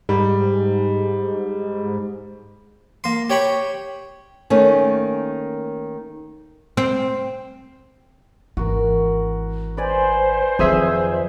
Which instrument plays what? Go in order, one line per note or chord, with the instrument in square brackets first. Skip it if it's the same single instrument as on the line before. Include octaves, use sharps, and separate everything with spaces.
[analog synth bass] G#2 [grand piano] G3
[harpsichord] A#3 C6
G4 C#5 G5 B5 C#6
[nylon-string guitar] D#3 A3 A#3 C#4
[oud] C4
[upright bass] G#1 E3 [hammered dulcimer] F#4 A#4
[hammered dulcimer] B4 D5 G#5 [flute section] C5
[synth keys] F2 G#4 E5 [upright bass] D#3 F#3